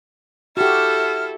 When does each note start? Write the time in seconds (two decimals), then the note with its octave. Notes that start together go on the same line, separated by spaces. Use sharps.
0.57 E4 F#4 G4 A4 F6